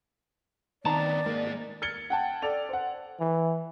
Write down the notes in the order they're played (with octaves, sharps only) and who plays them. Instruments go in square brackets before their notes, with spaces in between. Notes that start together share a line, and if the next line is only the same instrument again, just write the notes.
[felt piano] D#3 [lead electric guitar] B3 C4 [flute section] D5 [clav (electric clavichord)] A5 A#5
[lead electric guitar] G#3 D#4 [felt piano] A#3
[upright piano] F6 G#6 A6 C#7 G7
F#5 G5 A5
A4 D5 F7
C5 F#5
[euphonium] E3